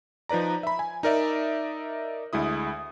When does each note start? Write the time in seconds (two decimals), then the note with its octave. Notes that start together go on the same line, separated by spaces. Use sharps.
0.29 F3 D#4 B4 D5 A#5
0.63 E5 B5
0.79 G#5
1.03 D#4 A#4 D5 E5
2.33 D2 G#3 E4 D#6